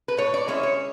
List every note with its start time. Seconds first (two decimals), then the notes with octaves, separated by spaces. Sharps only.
0.08 B4
0.17 A2 C#5
0.34 D5
0.48 G#3 C#4 E4 C#5
0.63 C#5